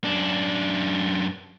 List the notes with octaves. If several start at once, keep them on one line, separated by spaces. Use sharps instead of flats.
F#2 D4